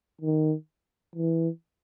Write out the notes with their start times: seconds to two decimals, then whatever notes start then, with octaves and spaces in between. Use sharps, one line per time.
0.21 D#3
1.15 E3